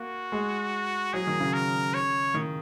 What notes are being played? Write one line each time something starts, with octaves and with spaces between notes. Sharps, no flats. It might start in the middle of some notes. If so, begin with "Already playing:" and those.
Already playing: A#3 F#4
G#3
F#3 G#4
D#3
C#3
A#4
C#5
D#3